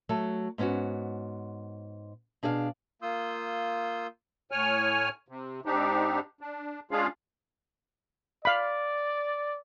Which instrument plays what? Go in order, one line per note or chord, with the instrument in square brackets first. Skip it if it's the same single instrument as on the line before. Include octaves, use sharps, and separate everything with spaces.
[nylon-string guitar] F#3 A3 A4
G#2 B3 C#4 E4 F#4
B2 D4 G#4 D#5 F5
[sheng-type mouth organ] A#3 F4 C6 D#6 E6 G6
[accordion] A2 C#5 G#5 F6
C3
G#2 C4 D4 D#4 G4
D4
G#3 C#4 D4 F4 G#4 F5
[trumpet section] D5 [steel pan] F5 B5